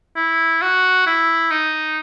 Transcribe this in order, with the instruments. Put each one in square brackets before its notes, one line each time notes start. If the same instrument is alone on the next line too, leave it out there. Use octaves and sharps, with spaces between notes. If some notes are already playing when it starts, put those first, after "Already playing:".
[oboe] E4
F#4
E4
D#4